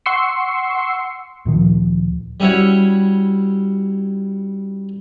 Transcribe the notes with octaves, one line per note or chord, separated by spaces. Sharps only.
F#5 C6 C#6 E6 C7 C#7
D2 A#2 D#3 F3
G3 C#4 E4 F#4 C#5